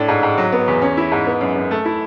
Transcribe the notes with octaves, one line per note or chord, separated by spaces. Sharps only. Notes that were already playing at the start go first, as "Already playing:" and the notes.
Already playing: A2 D4
G#2
G#2
F#3
B3
E2
C#4
E4
G#2
B3
F#2
F#2
A3
E4